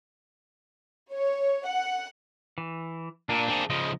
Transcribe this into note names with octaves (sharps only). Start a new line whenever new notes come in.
C#5
F#5
E3
A#2 A#3 D4
C4 G#4
C#3 F3 D#5